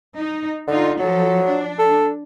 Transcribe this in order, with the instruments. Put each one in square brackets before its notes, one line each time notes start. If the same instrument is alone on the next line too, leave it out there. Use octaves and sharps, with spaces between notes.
[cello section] D#4
[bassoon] D3 [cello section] D#4 F4
[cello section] F3 A4 [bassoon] F#3
[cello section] D4
[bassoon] A4